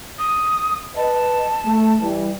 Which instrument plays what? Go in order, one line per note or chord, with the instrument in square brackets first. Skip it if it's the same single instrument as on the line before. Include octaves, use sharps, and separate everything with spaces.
[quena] D#6
[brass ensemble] B4 D#5 [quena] A5
[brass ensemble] A3
E3 G3